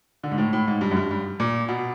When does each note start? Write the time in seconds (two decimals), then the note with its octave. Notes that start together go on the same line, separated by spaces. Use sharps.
0.23 D3
0.31 G#2
0.38 A2
0.53 A2
0.68 G#2
0.81 G2
0.91 F#2
0.97 G2
1.11 G2
1.40 A#2
1.68 B2